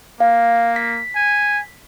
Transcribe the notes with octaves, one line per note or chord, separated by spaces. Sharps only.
A#3 F5
B6
G#5